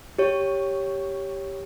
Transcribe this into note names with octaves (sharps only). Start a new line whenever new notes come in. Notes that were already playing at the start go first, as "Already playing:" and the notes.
G4 C#5